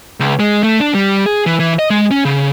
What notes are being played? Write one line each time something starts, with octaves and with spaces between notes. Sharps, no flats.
C#2
G#3
A3
D4
G3
G#4
E3
E3
D#5
G#3
C#4
C#3